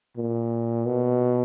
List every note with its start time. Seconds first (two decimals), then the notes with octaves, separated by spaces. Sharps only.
0.17 A#2
0.86 B2